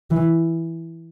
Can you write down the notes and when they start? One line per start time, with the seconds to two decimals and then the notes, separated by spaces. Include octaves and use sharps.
0.10 E3